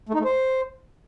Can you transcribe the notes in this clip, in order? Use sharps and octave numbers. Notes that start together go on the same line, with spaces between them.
A3
D#4
A3
C5